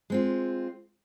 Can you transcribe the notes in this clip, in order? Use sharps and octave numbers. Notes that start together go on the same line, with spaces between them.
G#3 C4 F4